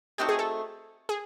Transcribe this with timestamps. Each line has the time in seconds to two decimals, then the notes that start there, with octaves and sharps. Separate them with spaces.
0.18 A3 C4 D#4 F#4 G4
0.29 G#4
0.39 A4
1.09 G#4